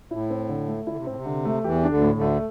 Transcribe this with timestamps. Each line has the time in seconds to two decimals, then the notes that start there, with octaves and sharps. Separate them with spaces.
0.11 A2 E4
0.30 C4
0.49 D3
0.68 A3
0.87 D3 E4
0.97 C3
1.06 A2 C4
1.15 C3
1.26 D3
1.45 A3
1.64 E2 E3 G4
1.83 D4
1.89 D2 D3
2.02 A2
2.15 D2 D3
2.21 A3